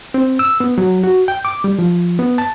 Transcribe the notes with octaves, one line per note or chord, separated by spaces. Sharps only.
C4
E6
B3
F#3
F#4
G5
D6
G3
F3
B3
A5